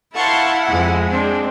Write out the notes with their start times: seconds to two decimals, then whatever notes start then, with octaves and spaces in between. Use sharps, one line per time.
0.16 E4 C5 F5 F#5 A5 C6 C#6
0.67 F2 G#3
1.10 C4 D4